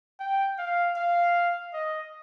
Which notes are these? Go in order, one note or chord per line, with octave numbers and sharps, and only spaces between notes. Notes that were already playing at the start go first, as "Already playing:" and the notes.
G5
F5
F5
D#5